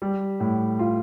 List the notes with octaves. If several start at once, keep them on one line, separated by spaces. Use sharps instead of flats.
G3
A2
F4